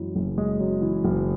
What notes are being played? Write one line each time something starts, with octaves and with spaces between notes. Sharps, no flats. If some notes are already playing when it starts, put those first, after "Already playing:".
Already playing: F#2 E3 G#3
F#1
G#3
F#2
E3
F#1